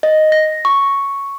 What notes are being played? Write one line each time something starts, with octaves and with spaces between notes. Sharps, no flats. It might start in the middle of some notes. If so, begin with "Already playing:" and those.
D#5
A#6
C#6